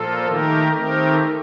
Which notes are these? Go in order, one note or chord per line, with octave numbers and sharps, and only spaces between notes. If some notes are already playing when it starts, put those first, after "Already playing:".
Already playing: A#2 F3 A#3 F4 A4
D#3 A3 D#4 G4 A#4
D#3 A3 C4 D#4 G4 A#4